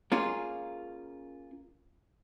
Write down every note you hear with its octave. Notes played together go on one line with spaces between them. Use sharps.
A#3 C#4 F4 G#4